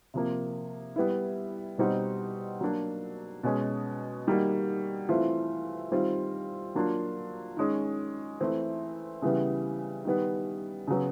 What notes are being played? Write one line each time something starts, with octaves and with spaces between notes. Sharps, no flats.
C3 F3 A#3
G3 B3 E4
B2 G3 C4 D#4 F#4
F#3 A#3 D4
B2 G#3 C#4
D#3 G3 A#3 D#4 F#4
E3 A3 C4 F4
D#3 G3 C4 F4
F#3 A#3 D4 F4
D#3 G#3 C#4
E3 A3 C4 E4
C#3 E3 G3 B3
D#3 G3 B3
C#3 F#3 B3